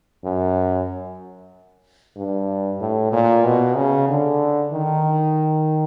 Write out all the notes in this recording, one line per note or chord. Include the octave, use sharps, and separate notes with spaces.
F#2
G2
A2
A#2
B2
C#3
D3
D#3